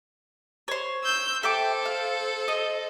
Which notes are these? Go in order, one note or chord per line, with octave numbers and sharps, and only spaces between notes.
C5 C#5
E6 G6
A4 C5 E5 G5 D6
F5
D#5